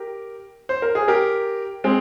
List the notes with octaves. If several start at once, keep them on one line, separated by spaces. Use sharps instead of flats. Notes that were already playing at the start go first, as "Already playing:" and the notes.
Already playing: G4 A#4
C5
A#4
G#4
G4 A#4
G#3 C4